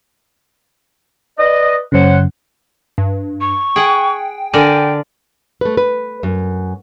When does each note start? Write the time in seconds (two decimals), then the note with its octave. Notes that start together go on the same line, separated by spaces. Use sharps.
1.38 B4 D5 D#5
1.92 F#2 C#3 C5 C#5 F#5
2.98 G2
3.41 C#6
3.76 G#4 F#5 G5
4.54 D3 A#4 D5 G5 G#5
5.61 A3 B4
5.77 B4
6.23 F#2